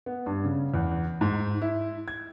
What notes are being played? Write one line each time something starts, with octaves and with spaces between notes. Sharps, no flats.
B3
G2
C#3
E2
G#2
E4
G#6